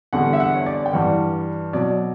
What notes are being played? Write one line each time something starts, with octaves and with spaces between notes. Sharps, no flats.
E2 D3 G3 F#5
E5
F#5
C#5
D5
G5
G2 E3 G3 F#5
B2 F#3 D5